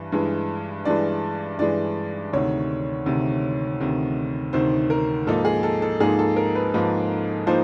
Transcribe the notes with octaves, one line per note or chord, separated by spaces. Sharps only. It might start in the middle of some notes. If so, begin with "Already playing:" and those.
Already playing: G2 E3
G2 E3 G#3
G2 E3 G#3 D5
G2 E3 G#3 D5
D2 C3 D#3 C#5
D2 C3 D#3
D2 C3 D#3
D2 C3 D#3 C5
A#4
G#2 F3 A#3 D#4 A4
G#4
A4
A4
G#2 F3 A#3 D#4 G#4
A4
A#4
B4
G#2 F3 A#3 D#4 B4
F3 A#3 D#4 C5